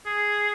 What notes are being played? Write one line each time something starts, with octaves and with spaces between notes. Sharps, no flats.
G#4